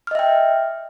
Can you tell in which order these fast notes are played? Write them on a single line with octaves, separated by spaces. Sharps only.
F6 D#5 E5 G5